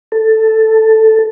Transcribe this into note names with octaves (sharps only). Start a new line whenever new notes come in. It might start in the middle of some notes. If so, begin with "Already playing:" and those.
A4